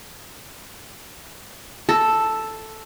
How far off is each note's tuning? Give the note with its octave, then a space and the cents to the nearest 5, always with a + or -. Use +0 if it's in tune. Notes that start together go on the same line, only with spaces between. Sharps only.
A4 +0